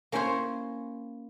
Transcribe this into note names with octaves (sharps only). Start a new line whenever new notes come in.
A#3 C#4 E4 A#4 C5 C#5